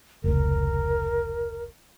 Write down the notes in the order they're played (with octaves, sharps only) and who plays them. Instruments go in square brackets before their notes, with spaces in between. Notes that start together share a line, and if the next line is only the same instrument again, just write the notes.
[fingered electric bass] F1 C#2 [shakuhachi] A#4